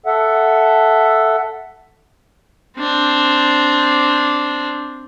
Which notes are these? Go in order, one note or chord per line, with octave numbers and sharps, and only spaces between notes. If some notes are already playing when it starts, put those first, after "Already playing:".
A4 E5 F#5
C4 D4